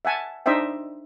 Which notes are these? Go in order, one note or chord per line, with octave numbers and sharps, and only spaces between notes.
E5 F#5 G#5 A5
D4 D#4 C5 D#5 E5 G5